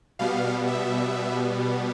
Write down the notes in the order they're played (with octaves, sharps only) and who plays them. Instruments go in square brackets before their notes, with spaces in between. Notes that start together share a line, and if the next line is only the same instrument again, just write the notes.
[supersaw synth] B2 G3 B3 F5
E5